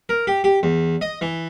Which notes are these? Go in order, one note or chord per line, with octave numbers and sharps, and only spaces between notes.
A#4
G4
G4
E2
D#5
E3